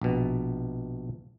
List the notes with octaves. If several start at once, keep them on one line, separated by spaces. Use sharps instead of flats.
A#1 B2